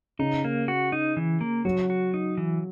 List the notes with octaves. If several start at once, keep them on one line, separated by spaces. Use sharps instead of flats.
C#3 D#4
A#3
F#4
D#4
E3
A#3
F#3 F#4
F#4
D#4
E3